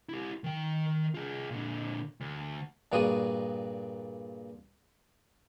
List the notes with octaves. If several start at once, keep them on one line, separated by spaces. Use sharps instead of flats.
E4 G4
D#3 G5
F4 G#4
A#2 D3
D2
G2 A#2 G3 F#4 G#4 D#6